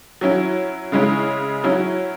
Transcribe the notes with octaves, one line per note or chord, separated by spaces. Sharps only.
F#3 C#4 E4
C#3 G#3 C#4 E4
F#3 C#4 E4